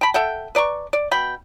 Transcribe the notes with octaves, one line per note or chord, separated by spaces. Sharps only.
G5 A5 B5
A4 E5 F#5 G5
B4 D5 A#5 C#6
D5
B2 G5 B5